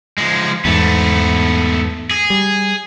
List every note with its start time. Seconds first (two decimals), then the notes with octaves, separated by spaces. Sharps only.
0.18 F3 G#3
0.65 E2 G#2 A3 B3
2.11 G#4
2.30 G3